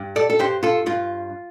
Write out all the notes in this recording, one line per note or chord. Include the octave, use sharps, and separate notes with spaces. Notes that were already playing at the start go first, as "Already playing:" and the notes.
Already playing: G2
A4 D5
A4
G2 G4 C5
F4 A4
G2 F4